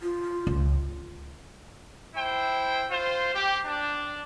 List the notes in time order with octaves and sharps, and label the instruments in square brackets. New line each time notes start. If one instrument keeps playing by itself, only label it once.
[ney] F4
[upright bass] C#2
[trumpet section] E4 C5 G5
F4 C5
G4
D4